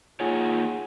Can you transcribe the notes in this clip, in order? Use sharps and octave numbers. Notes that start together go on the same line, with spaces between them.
A#3 D#4 F4 G#4 C#5 F#5 G#5